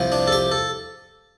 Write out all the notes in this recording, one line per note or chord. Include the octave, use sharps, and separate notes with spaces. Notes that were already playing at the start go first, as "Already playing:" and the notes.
Already playing: C2 C3 F3
D4
A4
G4
A4